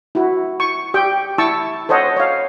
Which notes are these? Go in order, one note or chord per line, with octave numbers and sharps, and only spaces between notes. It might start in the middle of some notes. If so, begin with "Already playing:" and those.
E4 F#4
C#6
G4 G5
E4 A5 C#6 E6
A4 C5 C#5 D#5 F#5
C#5 F5